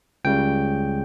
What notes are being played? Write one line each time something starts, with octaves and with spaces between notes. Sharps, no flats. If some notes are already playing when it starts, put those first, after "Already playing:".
C#2 C#3 G3 G5